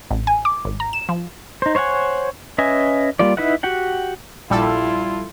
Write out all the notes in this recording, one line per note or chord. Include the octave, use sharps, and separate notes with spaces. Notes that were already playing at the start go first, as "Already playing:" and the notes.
A1
G#5
D6
G#1
A#5
E7
F3
D#4 C5
C5 C#5 F5 F#5 G#5
C#4 B4 D#5 E5 G#5
G3 A#3 F4 D5
D#4 E4 B4 E5 F#5
F#4 G4 F#5 G5
A#1 G3 E4 F4 A4